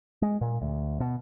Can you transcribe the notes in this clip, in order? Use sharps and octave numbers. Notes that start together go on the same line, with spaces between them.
G#3
A#2
D2
B2